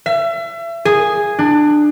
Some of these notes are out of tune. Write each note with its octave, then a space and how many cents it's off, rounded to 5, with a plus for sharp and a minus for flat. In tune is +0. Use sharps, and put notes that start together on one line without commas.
E5 +35
G#4 -5
D4 +20